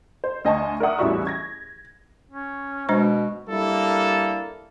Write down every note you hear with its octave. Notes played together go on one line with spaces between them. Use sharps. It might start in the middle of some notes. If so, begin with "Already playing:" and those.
C5
D2 D#5 G#5 A5 C#6
A#4 D5 E5 F#5 D#6
A1 E2 G3 F#4 E5 C#6
G#6 A#6
C#4
B2 G#3 D4 C5
G3 A#3 D4 E4 A4